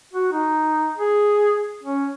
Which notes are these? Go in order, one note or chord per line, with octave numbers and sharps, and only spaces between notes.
F#4
D#4
G#4
C#4